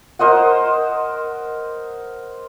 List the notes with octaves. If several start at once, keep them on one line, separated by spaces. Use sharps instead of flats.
A#4 C5 D#5 F#5